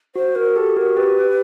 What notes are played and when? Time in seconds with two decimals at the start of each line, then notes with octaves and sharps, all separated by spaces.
0.16 F#4 C5
0.35 F#4 A#4
0.56 G4 A4
0.77 F#4 A#4
0.97 G4 B4